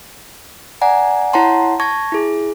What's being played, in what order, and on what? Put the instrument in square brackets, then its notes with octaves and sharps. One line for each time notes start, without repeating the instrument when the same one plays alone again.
[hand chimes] D5 F#5 G#5 A#5
E4 C#5 F#5 A5 A#5 C6
A5 C#6 G#6 A#6
E4 G#4